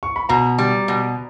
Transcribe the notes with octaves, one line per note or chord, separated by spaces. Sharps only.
C#6
B5
B2 A#5
G3
B2